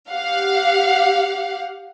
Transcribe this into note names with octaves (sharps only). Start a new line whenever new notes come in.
G4 F5 F#5